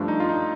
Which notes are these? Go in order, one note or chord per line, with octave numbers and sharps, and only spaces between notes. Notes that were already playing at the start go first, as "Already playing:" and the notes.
Already playing: G2 F3 A3 D4
D#4
F4
D#4